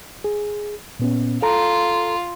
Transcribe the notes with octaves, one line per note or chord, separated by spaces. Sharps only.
G#4
A#2 B3 C#4
F4 A4 A#5